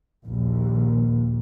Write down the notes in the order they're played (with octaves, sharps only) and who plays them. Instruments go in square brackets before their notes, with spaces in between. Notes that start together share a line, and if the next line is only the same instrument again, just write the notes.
[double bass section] A#1 D#2